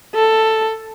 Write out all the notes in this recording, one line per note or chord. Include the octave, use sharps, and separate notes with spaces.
A4